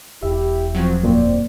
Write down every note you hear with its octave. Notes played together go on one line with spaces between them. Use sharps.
E1 E4 G4 E5
F3 F#3 C4
F#2 A#2 A#3 C4 D5